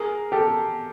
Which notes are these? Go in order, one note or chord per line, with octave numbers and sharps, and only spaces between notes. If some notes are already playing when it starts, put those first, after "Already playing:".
Already playing: G#4 A#4
G4 A4